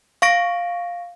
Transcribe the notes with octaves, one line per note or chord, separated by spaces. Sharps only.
F5 C#6 A#6 D7